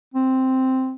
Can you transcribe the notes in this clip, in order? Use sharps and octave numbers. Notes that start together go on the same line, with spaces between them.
C4